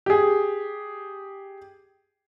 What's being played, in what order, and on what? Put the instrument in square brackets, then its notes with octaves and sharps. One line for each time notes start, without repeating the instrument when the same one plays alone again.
[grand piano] G4 G#4